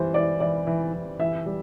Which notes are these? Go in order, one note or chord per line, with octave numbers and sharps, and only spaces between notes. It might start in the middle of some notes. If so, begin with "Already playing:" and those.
Already playing: E3 G3 C5
E3 D5
E3 D5
E3
E3
E3 E5
G3